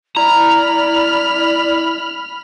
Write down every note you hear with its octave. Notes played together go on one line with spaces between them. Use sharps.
E4 D5 A#5 B5 F6